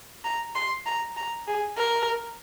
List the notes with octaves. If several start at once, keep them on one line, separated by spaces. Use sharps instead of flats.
A#5
C6
A#5
A#5
G#4
A#4